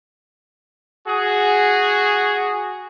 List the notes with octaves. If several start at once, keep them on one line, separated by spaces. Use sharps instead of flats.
F#4 G#4